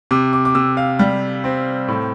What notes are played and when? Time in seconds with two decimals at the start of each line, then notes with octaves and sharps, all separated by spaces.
0.11 C3 D6
0.33 D6
0.45 D6
0.55 C3 E6
0.77 F5
0.99 G3
1.44 C4
1.88 A2